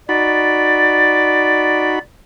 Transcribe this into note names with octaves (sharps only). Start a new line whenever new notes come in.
D#4 F#4 D5 B5 A6